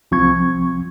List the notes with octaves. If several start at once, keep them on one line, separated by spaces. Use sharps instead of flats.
C2 F3 C4 C#6 G#6